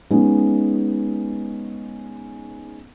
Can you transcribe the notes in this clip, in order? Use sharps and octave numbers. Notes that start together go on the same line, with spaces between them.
G#3 B3 C#4 D#4